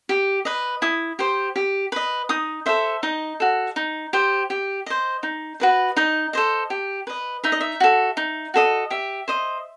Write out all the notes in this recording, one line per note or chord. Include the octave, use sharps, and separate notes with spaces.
G4
B4 D#5
E4 D#6
G4 C5
G4
B4 D#5
D#4 D#6
A4 C5 E5
D#4 D#5
F#4 A4
D#4
G4 C5
G4
C5 D#5
D#4
F#4 B4 D#5
D#4 D#5
A4 C5 D#5
G4
B4 D#5
D#4 E5
D#5
E5
F#4 A4
D#4
F#4 A4 D#5
G4 E5
C5 D#5